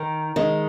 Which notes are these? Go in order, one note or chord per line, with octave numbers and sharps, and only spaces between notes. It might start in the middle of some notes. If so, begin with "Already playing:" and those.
Already playing: D#3
D#3 G#3